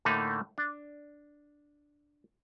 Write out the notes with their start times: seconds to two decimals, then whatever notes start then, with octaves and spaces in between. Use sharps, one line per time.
0.05 A2 D3 A3 A#3 D#4
0.58 D4